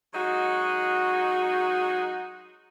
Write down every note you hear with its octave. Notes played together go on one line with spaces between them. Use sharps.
F#3 G#3 D#4 F#4